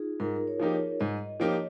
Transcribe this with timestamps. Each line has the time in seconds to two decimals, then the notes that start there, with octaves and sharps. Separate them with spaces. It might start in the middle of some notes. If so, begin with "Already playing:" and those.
Already playing: D#4 F4 G#4
0.20 G#2 A#4
0.47 C#5
0.60 F3 A#3 D#4 G4
0.73 C#5
1.00 G#2 D#5
1.40 F3 A#3 D#4 G4 C#5